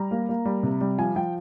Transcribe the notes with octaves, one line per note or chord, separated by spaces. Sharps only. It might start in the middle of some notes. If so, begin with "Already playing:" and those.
Already playing: G3 A#5
A#3
A#3
G3
C3
G3
F3 G#5
F3 G5